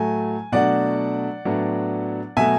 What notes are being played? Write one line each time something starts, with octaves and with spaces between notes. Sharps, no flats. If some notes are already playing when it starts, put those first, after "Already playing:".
Already playing: A2 F#3 A3 G#5
B2 F#3 A3 D4 D5 F#5
A2 F#3 B3 D4
B2 F#3 A3 E5 G#5